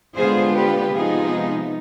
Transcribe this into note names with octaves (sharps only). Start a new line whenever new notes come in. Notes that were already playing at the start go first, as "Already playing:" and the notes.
D3 G#3 B3 D4 F4 G#4 C5
G4 B4
C3 F3 G#3 B3 D#4 F4 G#4